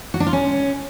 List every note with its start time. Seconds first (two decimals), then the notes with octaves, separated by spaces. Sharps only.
0.14 F#4
0.20 D4
0.27 F4
0.33 C#4